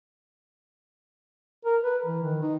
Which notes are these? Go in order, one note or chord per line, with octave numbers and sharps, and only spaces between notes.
A#4
B4
E3
D#3
D#4